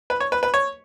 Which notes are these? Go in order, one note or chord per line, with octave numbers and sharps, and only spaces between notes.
B4
C#5
B4
B4
C#5